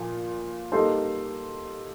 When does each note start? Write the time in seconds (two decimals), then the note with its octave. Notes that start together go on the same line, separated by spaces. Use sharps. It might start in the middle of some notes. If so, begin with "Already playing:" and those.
Already playing: A#2 F3 A#3 F4
0.72 G3 A#3 D#4 A4 C5